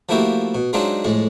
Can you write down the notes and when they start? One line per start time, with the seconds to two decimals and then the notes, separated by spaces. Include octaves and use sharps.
0.09 F3 A3 A#3 E4 F#4 G4
0.55 B2
0.73 F#3 G#3 C4 D4 D#4 F4
1.04 F2 A2 G#3